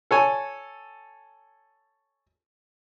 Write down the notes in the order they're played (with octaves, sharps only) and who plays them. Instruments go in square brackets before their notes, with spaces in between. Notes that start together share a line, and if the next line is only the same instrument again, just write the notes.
[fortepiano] A4 C#5 G#5